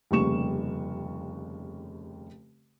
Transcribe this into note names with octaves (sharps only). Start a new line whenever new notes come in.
F1 D#2 C#3 G3 C#6 E7